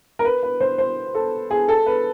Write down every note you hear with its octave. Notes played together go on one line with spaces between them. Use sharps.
A#4
B4
B4
C5
C5
A4
G#4
A4
B4